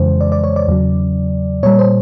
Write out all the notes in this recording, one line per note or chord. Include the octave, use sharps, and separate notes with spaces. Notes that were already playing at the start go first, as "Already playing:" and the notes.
Already playing: F2 C#3 E3 G#3 C5
D5
D5
C#5
D5
E2 C#3 F#3
A#2 G3 C#5
C5